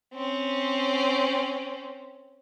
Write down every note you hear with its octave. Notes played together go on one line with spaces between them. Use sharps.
C4 C#4